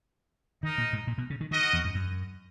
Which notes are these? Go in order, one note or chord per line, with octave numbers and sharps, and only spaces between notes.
D#3 D#4 A#4 D#5
A#2
G#2
A#2
B2
C#3
D#3
D#3 F#4 A#4 D#5 F#5
E2
F#2
F#2